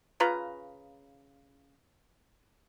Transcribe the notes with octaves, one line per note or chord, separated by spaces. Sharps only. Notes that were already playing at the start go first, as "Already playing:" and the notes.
C#3 F4 B4 A#5